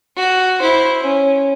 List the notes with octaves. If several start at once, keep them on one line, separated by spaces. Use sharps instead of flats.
F#4
E4 C5
C#4